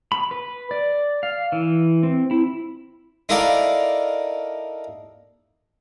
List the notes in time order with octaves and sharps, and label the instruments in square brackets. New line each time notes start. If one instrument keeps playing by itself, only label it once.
[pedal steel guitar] B5
B4
D5
F5
E3
C4
E4
[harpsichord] D#4 E4 A4 A#4 D5 F5